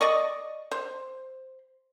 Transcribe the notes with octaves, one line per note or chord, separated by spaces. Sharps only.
D5 D#5 C#6
C5